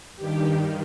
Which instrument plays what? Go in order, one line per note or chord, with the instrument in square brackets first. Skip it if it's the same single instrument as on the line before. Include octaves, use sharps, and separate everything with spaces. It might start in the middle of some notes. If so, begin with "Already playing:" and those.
[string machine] G2 D#3 G4